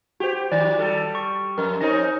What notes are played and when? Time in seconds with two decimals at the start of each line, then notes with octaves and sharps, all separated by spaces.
0.20 F#4 G4 C5
0.52 D#3 D5
0.78 G3 A4
1.15 C#6
1.58 F2 A#4
1.81 C4 C#4 D#4 A#6